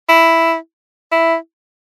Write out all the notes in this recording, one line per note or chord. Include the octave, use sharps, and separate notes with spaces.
E4
E4